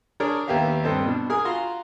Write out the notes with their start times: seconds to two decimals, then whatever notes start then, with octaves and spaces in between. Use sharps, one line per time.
0.20 D4 G#4 A#4 C#5 D5
0.48 D#2 B3 G4 E5 F5
0.83 G2 C4 A4 D#5
1.05 B2 D4
1.30 G#4 A#4 G#5 D#6
1.45 F4 F#4 A#5 C6